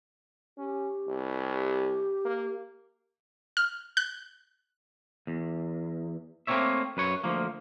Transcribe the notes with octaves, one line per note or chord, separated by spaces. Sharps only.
C#4 G4
C2
G4
A#3
F6
F#6
E2
A3 A#3 C4 D4 C#5 E5
F#2 B4 C#5
D2 F3 A#3